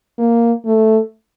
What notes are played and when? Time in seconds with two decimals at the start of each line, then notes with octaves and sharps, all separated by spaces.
0.18 A#3
0.65 A3